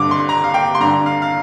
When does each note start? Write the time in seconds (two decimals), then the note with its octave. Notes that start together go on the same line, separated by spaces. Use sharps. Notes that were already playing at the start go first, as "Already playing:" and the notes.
Already playing: G2 D3 D6
0.11 C6
0.29 A#5
0.44 F5
0.54 G5
0.75 C6
0.80 G2 D3 A#5
1.06 F5
1.22 F5